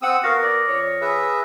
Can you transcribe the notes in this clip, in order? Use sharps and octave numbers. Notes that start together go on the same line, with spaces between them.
C4 F#5 D#6 E6
B3 F#4 A#4 F5 D#6 F6 A#6
D5 A#6
F2 C#5
G#4 B4 E5